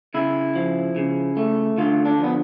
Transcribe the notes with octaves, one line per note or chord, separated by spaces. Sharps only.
C#3 E4
F3
C#3
A3
D3 F4
D4
F3
B3